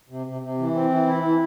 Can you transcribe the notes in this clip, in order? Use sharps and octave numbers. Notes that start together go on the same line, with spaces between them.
C3
C3
C3
E3
C4
E3
E4
E3